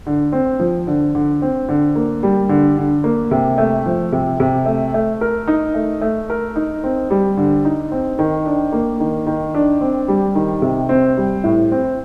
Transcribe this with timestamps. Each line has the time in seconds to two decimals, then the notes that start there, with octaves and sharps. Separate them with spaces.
0.06 D3
0.32 C4
0.59 F3
0.87 D3
1.15 D3
1.42 C4
1.68 D3
1.96 A#3
2.23 G3
2.49 D3
2.77 D3
3.04 A#3
3.31 C3
3.58 A3
3.86 F3
4.12 C3
4.40 C3
4.66 A3
4.94 A3
5.21 A#4
5.48 D#4
5.74 A3
6.01 A3
6.30 A#4
6.56 D#4
6.84 C4
7.10 G3
7.37 D3
7.65 D#4
7.91 C4
8.19 D#3
8.46 D4
8.72 A#3
9.00 D#3
9.26 D#3
9.54 D4
9.81 C4
10.08 G3
10.35 D#3
10.62 C3
10.89 C4
11.17 G3
11.44 A2
11.72 C4